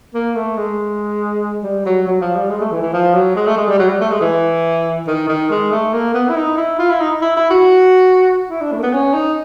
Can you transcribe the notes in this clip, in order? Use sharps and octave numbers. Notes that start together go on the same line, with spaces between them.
A#3
A3
G#3
G3
F#3
F#3
F3
G3
G#3
A3
E3
E3
F3
F#3
G#3
A3
G#3
G3
F#3
G3
A3
G#3
E3
D#3
D#3
G#3
A3
A#3
B3
E4
D#4
E4
F4
E4
D#4
E4
E4
F#4
E4
D4
A3
A#3
B3
C#4
D#4